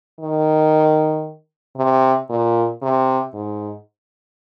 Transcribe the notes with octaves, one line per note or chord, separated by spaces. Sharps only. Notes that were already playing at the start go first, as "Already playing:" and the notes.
D#3
C3
A#2
C3
G#2